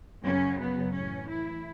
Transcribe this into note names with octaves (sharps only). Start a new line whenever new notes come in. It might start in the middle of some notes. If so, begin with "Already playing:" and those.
F#2 C#3 F#3 C#4
B3
A2 E3 C#4
E4